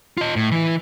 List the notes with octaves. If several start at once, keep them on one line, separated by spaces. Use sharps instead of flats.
F4 D#5
A2
E3 E4